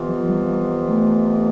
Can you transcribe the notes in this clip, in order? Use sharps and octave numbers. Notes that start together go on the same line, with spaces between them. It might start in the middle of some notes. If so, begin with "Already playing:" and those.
Already playing: F2 C3 E3 B3 F4
F3
G3
F3
A3